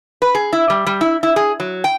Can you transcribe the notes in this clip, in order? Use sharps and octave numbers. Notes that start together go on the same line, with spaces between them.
B4
G#4
E4
G3
G3
E4
E4
G#4
F#3
G5